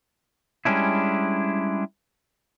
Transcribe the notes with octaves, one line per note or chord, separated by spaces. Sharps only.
G3 G#3 C#4 D4 E4